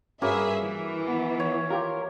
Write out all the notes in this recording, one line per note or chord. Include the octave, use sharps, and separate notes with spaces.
G2 A#3 C#4 F#4 G#4 B4 E5
E3
B3
C#5
F4 G4 A#4